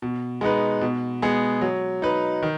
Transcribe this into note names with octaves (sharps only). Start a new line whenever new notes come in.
B2
G#3 B3 D#4 B4
B2
G#3 B3 G#4
F#3
D#4 B4
D#3